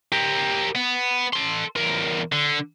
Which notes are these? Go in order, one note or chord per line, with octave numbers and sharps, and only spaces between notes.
G4 A#4
B3
A4 C6
E2 A#4
D3